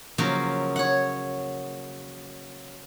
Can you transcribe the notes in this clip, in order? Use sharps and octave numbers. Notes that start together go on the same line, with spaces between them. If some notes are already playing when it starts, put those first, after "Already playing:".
C#3 F3 F#3 A#3
C#5 F#5